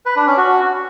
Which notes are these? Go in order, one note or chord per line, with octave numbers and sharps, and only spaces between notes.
B4
D4
C#4
F#4